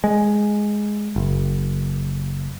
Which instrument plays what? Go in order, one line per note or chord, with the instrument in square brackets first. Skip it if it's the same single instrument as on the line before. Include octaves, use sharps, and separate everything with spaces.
[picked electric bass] G#3
F#1